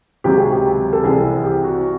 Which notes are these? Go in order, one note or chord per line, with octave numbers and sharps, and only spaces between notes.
C#2 C3 D#3 F#3 G4
G#4
G4
A4
C2 C3 E3 G#4
G4
F#4